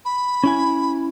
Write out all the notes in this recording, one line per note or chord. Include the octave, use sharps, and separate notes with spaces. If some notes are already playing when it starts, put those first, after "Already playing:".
B5
C#4 E4 G#5